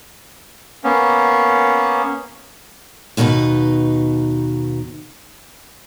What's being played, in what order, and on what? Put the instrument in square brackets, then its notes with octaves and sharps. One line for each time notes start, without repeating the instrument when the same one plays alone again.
[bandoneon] A#3 B3 C#4
[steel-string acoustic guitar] D#2 B2 D#4 A4 B4